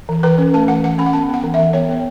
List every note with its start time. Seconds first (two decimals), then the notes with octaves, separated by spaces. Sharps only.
0.09 E3
0.23 E3 B4
0.38 C#4
0.54 A3 A5
0.68 E3 F#5
0.84 E3 F#5
0.98 C#4 B5
1.06 F#5
1.13 B3 A5
1.28 B3
1.34 F#5
1.44 E3
1.54 E5
1.59 E3
1.73 B3 C#5
1.89 B3